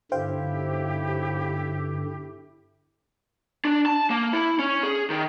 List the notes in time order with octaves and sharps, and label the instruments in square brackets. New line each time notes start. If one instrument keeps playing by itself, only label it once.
[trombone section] B1 E4 [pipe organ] G2 D3 [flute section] G4 [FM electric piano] C5 F5 G5
[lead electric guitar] D4
A5
A#3
E4
C#4
G#4
D#3